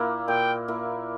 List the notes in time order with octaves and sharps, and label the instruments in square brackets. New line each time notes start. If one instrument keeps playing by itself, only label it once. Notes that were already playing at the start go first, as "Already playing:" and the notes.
Already playing: [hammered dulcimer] A#2 A#3 E4
[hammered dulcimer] A#2 [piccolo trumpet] G5
[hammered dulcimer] A#3 E4